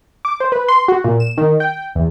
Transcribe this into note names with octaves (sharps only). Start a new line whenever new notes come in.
D6
C5
B4
C6
F#4
A#2
E7
D#3
G5
E2